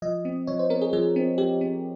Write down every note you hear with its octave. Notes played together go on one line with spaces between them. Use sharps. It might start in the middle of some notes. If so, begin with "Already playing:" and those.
F3 D#5
C4
F3 C#5
C5
C4 A#4
G#4
F3 G#4
C4
F3 G4
C4